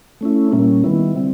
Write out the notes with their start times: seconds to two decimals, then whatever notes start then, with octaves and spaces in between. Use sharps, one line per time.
0.21 A3 C#4 E4
0.52 A#2 G3 A#3 C#4
0.84 D#3 G3 B3 E4
1.15 D3 G3 C4